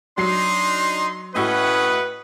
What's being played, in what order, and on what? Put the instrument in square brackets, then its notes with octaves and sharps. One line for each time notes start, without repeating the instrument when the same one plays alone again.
[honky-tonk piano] F#3 C7 [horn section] D4 D#4 [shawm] C6
[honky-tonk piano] A2 E4 F#4 [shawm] C#4 [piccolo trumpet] B4 [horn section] D#5 F#5